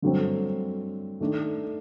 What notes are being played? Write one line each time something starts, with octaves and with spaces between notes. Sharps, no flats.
G2 D3 F#3 A3 C4
D#3 A3 D4